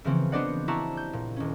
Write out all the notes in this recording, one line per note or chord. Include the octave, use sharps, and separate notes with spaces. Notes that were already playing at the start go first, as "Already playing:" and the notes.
C#3 E3 F3 A#3 C4 C#4
B3 D4 C5 D5 D#5 F#5
E4 F#4 G4 A5 A#5 C#6
G6
A#2
D#1 C#4